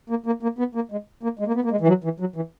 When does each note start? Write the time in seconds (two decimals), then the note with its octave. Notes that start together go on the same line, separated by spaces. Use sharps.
0.10 A#3
0.26 A#3
0.43 A#3
0.59 B3
0.75 A#3
0.92 G#3
1.23 A#3
1.39 G#3
1.47 A#3
1.55 B3
1.64 A#3
1.71 G#3
1.81 E3
1.88 F#3
2.04 E3
2.20 F#3
2.36 E3